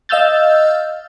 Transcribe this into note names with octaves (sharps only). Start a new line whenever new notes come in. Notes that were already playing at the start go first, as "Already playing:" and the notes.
D#5 F5 E6 F6 G6 A6